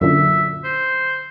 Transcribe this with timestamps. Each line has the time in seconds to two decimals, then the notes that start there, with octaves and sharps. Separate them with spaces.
0.01 F#2 A#2 D3 E5
0.64 C5